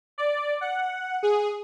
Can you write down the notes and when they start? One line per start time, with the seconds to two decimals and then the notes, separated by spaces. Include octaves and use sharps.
0.18 D5
0.61 F#5
1.23 G#4